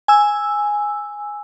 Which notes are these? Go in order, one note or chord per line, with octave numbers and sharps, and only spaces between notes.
G#5 E6